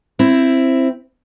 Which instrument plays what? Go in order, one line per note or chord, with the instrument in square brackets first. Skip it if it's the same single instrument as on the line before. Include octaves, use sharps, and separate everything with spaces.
[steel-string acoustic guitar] C4 E4